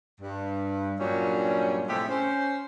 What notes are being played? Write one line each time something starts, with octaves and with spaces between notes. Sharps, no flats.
G2
G2 A#2 F#3 G3 C#4
A2 C3 F3 G#3 A3 G4
C#4 C5